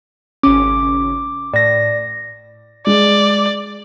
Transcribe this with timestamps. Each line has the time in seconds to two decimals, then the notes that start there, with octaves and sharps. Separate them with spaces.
0.43 G#1 C#3 C#4 D6
1.54 A2 D5 A#6
2.87 G#3 D5